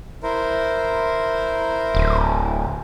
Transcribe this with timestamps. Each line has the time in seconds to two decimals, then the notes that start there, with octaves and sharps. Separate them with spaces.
0.23 E4 A#4 C5
1.95 D1